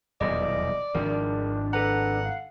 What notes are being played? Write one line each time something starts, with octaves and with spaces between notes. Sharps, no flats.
D#1 B1 E2 D5 D#5
G#1 D#3 F3 D4 A#4
A4 B4 F#5 A#5
F5